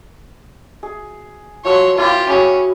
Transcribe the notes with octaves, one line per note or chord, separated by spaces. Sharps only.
G#4
F3 F#4 C#5 C6 E6
A#3 C#4 E4 F4 G4
C#4 F#4 G#4 B5